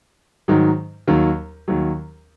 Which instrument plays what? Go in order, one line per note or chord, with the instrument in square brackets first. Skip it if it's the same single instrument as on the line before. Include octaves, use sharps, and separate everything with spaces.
[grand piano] G#2 D#3 F#3
D#2 D#3 F#3
D#2 D#3 F#3